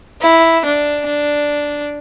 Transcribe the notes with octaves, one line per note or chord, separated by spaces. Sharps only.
E4
D4
D4